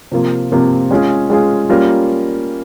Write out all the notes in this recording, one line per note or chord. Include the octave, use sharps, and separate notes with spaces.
C3 F3 A#3 F4
C3 F3 A#3 F4
G#3 C#4 F4 G#4
G#3 C#4 F4 G#4
G3 A#3 C#4 F4 A#4